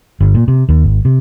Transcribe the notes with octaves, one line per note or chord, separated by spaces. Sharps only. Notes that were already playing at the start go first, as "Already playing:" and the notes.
G1
A#2
C3
D#2
G#1
C3